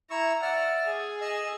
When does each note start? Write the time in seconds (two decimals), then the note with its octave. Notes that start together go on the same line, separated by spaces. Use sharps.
0.10 E4 A#5 C#6 E6
0.42 D5 E5 F#5 F6
0.86 G#4
1.21 D#5 E6